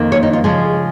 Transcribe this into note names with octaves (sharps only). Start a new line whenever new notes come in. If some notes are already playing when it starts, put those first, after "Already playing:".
Already playing: F2 D#3 A#3
C#5
D#4
F4
C#3 F3 G#3 G#4